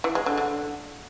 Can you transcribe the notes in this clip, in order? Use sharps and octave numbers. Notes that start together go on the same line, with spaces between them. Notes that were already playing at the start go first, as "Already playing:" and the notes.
E3
G#3
D3
D3